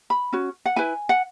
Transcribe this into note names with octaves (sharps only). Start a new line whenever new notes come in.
B5
C#4 F#4
F#5
E4 B4 G#5
F#5